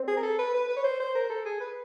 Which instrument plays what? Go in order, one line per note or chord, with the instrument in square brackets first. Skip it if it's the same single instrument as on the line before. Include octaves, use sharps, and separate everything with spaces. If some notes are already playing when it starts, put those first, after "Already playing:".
Already playing: [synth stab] C4
[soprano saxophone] G#4
A#4
A4
B4
B4
B4
C#5
C5
C5
A#4
A4
G#4
B4